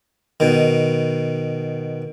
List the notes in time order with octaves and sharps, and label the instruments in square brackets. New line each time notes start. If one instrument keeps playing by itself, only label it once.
[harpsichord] B2 D#3